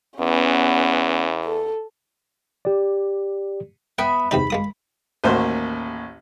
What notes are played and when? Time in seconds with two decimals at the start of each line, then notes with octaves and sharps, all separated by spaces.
0.20 E2 B3 C#4
1.45 A4
2.65 G4 D5
3.98 B3 E5 G5 B5
4.31 E2 C3 D#4 B5
4.50 G#3 A#3 D#6
5.24 A1 D#2 A#3 F#4 C5